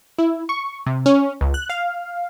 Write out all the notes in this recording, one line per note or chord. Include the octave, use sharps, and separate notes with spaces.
E4
C#6
C3
C#4
C#2
F#6
F5